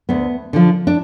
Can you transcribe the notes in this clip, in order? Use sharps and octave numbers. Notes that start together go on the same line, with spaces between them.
D2 B3
D3 F3
D4